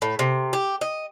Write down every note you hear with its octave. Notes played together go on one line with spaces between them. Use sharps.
A2
C3
G4
D#5